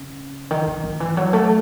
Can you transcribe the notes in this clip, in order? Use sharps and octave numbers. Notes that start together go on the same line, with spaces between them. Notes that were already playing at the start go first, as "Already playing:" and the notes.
Already playing: C#3
D#3
D#3
D#3
E3
F#3
A3